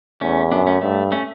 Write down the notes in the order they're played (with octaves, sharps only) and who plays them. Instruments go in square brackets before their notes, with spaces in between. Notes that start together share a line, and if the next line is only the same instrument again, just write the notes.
[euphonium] E2 [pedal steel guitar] A3 C#4
[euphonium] F#2 [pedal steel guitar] B3 D4
[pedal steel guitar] A3 C#4
[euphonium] G2 [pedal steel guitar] A3
[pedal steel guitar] A3 C#4